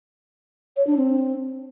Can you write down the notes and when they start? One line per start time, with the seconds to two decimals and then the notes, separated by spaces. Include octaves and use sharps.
0.77 C#5
0.87 D4
0.97 C4